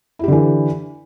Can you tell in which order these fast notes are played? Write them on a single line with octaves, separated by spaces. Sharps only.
E4 G4 D3 E3